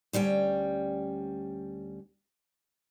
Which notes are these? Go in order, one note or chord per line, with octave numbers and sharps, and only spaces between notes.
D2 G3 C#4 G5